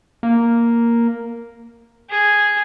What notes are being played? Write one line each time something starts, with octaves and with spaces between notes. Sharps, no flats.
A#3
G#4